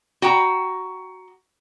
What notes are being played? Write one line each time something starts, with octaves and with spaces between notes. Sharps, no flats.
F#4 G5 A#5